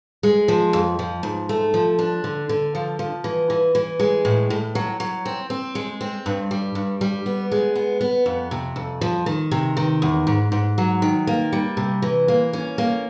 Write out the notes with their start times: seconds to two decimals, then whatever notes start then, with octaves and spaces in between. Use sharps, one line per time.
0.23 G#3
0.48 F3
0.73 F2
0.99 F3
1.23 G#2
1.49 A3
1.74 F3
1.99 D4
2.24 D3
2.49 D3
2.75 F3
2.99 F3
3.24 E3
3.50 E3
3.75 E3
4.00 G#3
4.25 A2
4.50 A2
4.75 F#3
5.00 F#3
5.25 C4
5.50 C4
5.75 G#3
6.01 C4
6.26 G2
6.51 G3
6.75 G2
7.01 G3
7.26 B3
7.52 G#3
7.75 B3
8.01 B3
8.26 F2
8.51 C3
8.76 F2
9.01 F3
9.26 D#3
9.51 C3
9.77 D#3
10.02 E2
10.27 G#2
10.52 G#2
10.78 F#3
11.02 D#3
11.27 A#3
11.53 G3
11.77 C3
12.02 E3
12.28 A#3
12.53 C#4
12.78 A#3